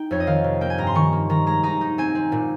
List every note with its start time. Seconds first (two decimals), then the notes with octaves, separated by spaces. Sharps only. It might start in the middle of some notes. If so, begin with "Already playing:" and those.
Already playing: D#4 G5
0.11 F2 C#5
0.20 D#5
0.27 D#3 F5
0.44 C3
0.61 A#3 G5
0.70 G#5
0.78 G2 A#5
0.87 C6
0.95 D#3 C#6
1.13 A#3
1.30 D#3 A#5
1.47 G#3 A#5
1.63 D#4 A#5
1.81 D#4
1.98 C4 G#5
2.15 C4
2.32 A#2